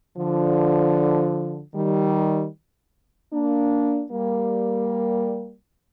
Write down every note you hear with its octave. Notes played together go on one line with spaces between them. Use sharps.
D3 F3
D#3 G3
A#3 D4
G3 A#3